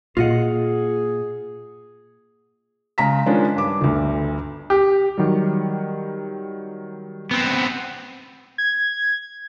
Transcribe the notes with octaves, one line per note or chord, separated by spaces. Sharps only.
A#2 F4 G#4 D#5 F#5
C#3 G#3 A#5 B6
D#3 F3 G#3 C#4 D4
G2 D6
G1 D2
G4
D#3 F#3 G3
B3 C4
G#6